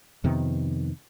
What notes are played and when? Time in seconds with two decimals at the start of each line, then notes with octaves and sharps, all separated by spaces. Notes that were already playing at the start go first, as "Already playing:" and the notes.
0.24 F2 C3 D#3 B3